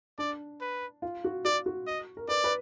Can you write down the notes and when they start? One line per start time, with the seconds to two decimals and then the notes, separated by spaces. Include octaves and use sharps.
0.18 D4 D5
0.61 B4
1.02 F4
1.24 F#4
1.45 F#4 D5
1.66 F#4
1.87 D#5
2.17 A#4
2.28 B4 D5
2.44 B4